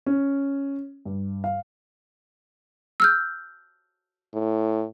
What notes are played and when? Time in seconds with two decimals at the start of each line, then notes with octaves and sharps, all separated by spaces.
0.06 C#4
1.05 G2
1.44 F5
3.00 E6 F6 G6
4.34 A2